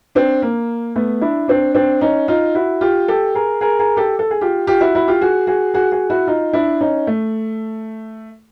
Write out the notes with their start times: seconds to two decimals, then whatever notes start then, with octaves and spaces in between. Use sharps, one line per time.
0.15 C4 D4
0.42 A#3
0.96 A3 B3
1.21 D4 E4
1.48 C4 D4
1.75 C4 D4
2.01 C#4 D#4
2.28 D#4 F4
2.55 E4 F#4
2.81 F4 G4
3.08 G4 A4
3.35 G#4 A#4
3.61 G#4 A#4
3.79 G#4 A#4
3.97 G4 A4
4.19 A4
4.31 G#4
4.41 F4 G4
4.67 F4 G4
4.81 E4 F#4
4.95 E4 F#4
5.08 F4 G4
5.21 F#4 G#4
5.47 F#4 G#4
5.74 F#4 G#4
5.92 F#4 G#4
6.10 E4 F#4
6.27 D#4 F4
6.53 D4 E4
6.81 C#4 D#4
7.07 A3